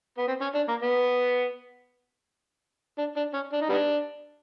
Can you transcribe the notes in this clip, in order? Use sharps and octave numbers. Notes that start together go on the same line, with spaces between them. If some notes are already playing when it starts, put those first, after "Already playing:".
B3
C4
C#4
D4
A#3
B3
D4
D4
C#4
D4
D#4
G3 B3 D4